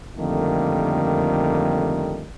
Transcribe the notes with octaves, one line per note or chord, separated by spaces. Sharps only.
F2 D3 D#3 G3 A3 A#3